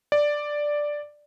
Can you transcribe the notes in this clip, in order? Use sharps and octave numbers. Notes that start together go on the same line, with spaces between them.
D5